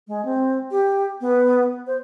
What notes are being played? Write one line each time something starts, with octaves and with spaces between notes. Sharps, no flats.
G#3
C4
G4
B3
C5